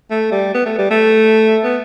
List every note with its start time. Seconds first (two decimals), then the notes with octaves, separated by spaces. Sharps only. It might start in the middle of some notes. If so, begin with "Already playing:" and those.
0.11 A3
0.32 G3
0.54 B3
0.66 A3
0.78 G3
0.91 A3
1.64 B3